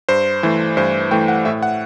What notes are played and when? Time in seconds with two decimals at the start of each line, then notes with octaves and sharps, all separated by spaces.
0.09 G2 C5
0.43 E3 A3
0.77 G2 C5
1.11 E3 A3 G5
1.28 F#5
1.45 A2 E5
1.63 F#5